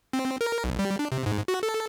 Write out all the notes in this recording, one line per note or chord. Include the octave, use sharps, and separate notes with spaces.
C4
A#4
B1
G3
D4
C3
G#2
F#4
A4